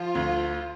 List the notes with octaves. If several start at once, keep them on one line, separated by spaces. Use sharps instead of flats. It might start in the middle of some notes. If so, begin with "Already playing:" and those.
Already playing: F3 F4
D2